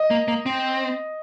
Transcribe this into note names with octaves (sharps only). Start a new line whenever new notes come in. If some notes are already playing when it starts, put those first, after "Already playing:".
Already playing: D#5
A#3
A#3
C4